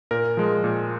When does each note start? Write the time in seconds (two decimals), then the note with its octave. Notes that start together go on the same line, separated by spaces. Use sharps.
0.11 A#2 A#4
0.37 F3 G#3
0.64 A#2